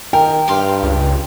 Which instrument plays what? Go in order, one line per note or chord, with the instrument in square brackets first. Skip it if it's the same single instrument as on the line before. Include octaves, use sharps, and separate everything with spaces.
[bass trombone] D#3 [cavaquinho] A#4 [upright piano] G5
[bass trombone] G2 [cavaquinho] G4 F5 C6
[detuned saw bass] C#2